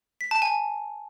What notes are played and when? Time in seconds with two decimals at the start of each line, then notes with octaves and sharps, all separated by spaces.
0.21 B6
0.31 A5
0.42 G#5